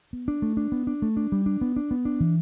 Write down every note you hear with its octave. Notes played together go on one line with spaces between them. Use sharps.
B3
D4
A3
D4
B3
D4
A3
D4
G3
D4
B3
D4
B3
D4
E3